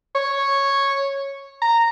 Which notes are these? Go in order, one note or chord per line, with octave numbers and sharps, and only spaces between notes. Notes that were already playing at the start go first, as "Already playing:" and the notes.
C#5
A#5